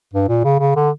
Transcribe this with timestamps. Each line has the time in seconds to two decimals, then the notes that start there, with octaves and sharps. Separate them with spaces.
0.13 G2
0.28 A#2
0.44 C#3
0.60 C#3
0.76 D3